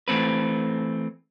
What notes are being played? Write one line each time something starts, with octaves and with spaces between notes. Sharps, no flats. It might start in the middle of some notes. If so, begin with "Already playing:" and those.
E3 A3 C4 B4